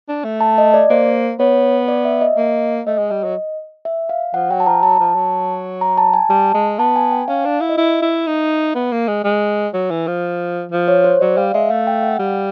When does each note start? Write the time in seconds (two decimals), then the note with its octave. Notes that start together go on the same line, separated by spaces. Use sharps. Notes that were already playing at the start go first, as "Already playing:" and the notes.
0.08 D4
0.24 A3
0.41 A5
0.58 D#5
0.74 D5
0.90 A#3 C5
1.39 B3 C#5
1.88 D5
2.05 E5
2.21 D#5
2.37 A#3 D#5
2.87 A3 D#5
2.98 G#3
3.11 G3
3.24 F#3
3.85 E5
4.09 F5
4.34 F3 F#5
4.51 F#3 G5
4.60 A5
4.66 F3 A#5
4.83 F#3 A5
4.99 F3
5.15 F#3
5.81 A#5
5.98 A5
6.13 G#5
6.30 G3 A5
6.54 G#3
6.79 B3 A5
6.96 G#5
7.11 G5
7.28 C#4 F5
7.45 D4
7.61 E4
7.69 D#5
7.77 E4 E5
8.02 E4
8.27 D#4
8.75 B3
8.92 A#3
9.08 G#3
9.24 G#3
9.73 F#3
9.90 E3
10.07 F3
10.71 F3
10.88 C#5
11.04 C5
11.21 F#3 D5
11.37 G3 F5
11.54 G#3 E5
11.70 A3 F5
11.87 G5
12.03 F#5
12.19 G3 F5